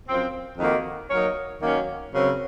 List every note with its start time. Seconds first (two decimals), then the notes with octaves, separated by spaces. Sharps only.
0.08 F#2 F3 C4
0.58 F2 D#3 A#3 D#4 F#4
1.10 F#3 A#3 D#4 A#4 C#5
1.61 D#3 F#3 A#3 C#4
2.13 F#2 C#3 F#3 C4